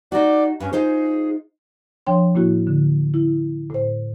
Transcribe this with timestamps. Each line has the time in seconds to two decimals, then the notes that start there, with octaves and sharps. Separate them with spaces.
0.12 D#4 F#4 D5
0.60 G2 C#4
0.73 D#4 F4 G#4 C5
2.07 F3 D4 C#5 G5 C6
2.35 A2 A#3 E4 F#4
2.67 D3
3.14 E4
3.70 A2 C5